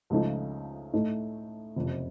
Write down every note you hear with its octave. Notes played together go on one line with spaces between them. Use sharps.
C#2 C#3 F3 A3 D#4
A2 A3 D#4
F#1 F2 C3